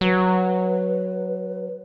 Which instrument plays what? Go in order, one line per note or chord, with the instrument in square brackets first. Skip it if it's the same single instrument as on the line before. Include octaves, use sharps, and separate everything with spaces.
[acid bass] F#3 [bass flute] B4